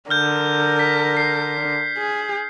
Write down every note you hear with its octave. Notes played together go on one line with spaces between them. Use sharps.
D3 A#4 F6 G6
B6
C7
G#4